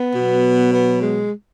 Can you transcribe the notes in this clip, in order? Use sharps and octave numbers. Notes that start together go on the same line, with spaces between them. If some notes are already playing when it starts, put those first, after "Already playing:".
Already playing: B3
B2 F#3
B3
G#3